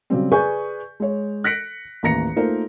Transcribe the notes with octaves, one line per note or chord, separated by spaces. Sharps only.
C#3 F#3 G3 C4
G#4 B4 D5 G#5 C#6 G6
G#3 C#5
F#6 A#6 B6 C#7 D7
A1 D#2 A#5 A#6 C#7
A3 A#3 D#4 F4 A#4 C5